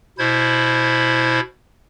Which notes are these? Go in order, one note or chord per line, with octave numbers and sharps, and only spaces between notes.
B2 E4 C5 G#6